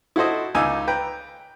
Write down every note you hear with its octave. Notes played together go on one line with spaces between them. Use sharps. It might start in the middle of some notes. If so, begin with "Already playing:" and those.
E4 F#4 A4 C5 D#5
C#2 D#4 G#5 D6 E6
B4 G5 A#5